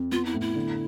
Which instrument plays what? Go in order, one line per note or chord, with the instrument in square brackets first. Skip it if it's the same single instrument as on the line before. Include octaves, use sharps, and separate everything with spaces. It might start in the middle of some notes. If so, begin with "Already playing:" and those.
Already playing: [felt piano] F2
[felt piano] B3 [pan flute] F4
[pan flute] E4
[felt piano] A2
[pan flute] E4
[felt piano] D3